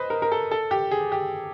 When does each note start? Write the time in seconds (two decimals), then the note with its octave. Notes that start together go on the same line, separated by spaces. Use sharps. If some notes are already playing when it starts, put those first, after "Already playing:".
Already playing: B4 C5 D#5
0.10 A#4
0.22 A#4
0.32 A4
0.51 A4
0.71 G4
0.91 G#4
1.12 G4